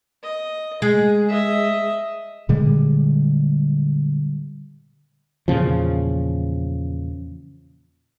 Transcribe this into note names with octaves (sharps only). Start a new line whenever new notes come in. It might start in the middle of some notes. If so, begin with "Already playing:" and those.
D#5
G#3 G#4
D#5 E5
A#2 D3 G3 G#3
E2 A#2 C#3 F3